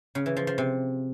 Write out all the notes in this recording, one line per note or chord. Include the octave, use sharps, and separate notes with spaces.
C#3
E3
F3
F3
C3